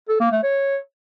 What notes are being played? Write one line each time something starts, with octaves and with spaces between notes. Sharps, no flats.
A4
A#3
A3
C#5